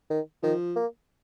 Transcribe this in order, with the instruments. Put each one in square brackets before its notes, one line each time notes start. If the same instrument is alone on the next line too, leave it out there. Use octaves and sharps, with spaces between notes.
[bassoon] D#3
[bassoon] D#3 [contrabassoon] F3
[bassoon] A#3